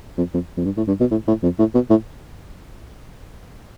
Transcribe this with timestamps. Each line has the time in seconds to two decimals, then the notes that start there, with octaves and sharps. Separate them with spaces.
0.18 F2
0.33 F2
0.57 F2
0.65 G2
0.77 A2
0.88 G2
1.00 B2
1.11 A2
1.28 A2
1.43 F2
1.59 A2
1.74 B2
1.90 A2